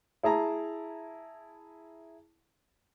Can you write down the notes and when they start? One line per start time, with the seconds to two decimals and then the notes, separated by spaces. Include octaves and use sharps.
0.23 E4 G#4 A5 A#5